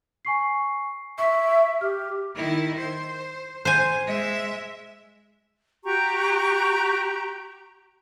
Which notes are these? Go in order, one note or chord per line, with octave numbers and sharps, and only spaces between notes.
G#5 C#6 C7
E5 C#6 B6
G4 F6
D#3 E4
C5
C5 G#5
G#3 E5
F#4 G4 A#5 C#6